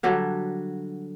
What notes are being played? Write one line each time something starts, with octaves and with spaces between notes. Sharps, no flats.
D3 F#3 G3 D4